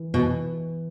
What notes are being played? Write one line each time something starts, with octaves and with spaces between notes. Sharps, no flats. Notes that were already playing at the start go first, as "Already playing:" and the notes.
Already playing: E3
B2
E3